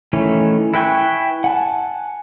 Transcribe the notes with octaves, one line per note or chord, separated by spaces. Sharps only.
D#3 E3 A3 C#4
E4 B4 G5 G#5 C#6
F#5 G#5 A5